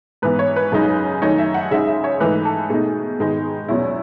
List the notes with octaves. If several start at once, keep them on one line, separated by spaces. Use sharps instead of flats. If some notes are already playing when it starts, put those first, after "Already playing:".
G#2 E3 B3 B4
C#5
B4
F#2 C#3 G#3 D#4
F#2 D#3 A3 D#4 C#5
E5
F#5
C#3 G#3 D#4 E5
E5
C#5
G#2 E3 A3 D#4 B4
A4
B2 A3 D#4 G#4
G#2 D#3 G#3 B3 D#4
E2 B2 F#3 C#4 E4